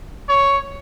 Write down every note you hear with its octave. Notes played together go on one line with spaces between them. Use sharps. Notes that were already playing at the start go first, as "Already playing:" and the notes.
C#5